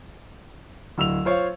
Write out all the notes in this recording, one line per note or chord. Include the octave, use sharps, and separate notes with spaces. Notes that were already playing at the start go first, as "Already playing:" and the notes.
D1 E6 F7
F4 C5 C#5 F5